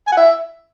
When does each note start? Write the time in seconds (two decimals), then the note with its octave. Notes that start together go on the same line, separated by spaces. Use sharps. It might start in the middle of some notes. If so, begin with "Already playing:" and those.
0.07 G#5
0.12 F#5
0.17 E5